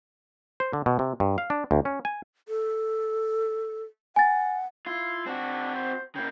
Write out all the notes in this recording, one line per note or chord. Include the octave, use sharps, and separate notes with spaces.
C5
D3
B2
C3
G2
F5
D4
D2
C#4
G#5
A4
F#5 G#5 A6
E4 F4
C4 D4 F#4
C5
C#3 A#3 G5